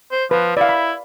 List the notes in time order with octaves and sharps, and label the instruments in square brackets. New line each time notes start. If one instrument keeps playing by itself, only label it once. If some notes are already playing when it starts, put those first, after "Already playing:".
[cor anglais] C5
[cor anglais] F3 [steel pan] B4
[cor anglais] E4 [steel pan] D5 F5
[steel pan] B5